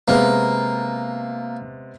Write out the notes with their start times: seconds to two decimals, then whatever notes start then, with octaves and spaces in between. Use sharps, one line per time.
0.08 C3 G#3 A#3 B3